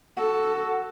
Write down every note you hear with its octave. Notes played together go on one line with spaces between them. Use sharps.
F#4 A4